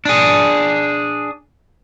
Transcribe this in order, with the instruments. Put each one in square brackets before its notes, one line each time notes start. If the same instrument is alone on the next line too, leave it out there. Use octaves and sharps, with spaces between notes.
[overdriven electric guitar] D4 G#4